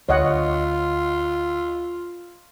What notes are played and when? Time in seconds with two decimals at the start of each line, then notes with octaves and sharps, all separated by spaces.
0.09 D2 F4 C#5 D#5 F#5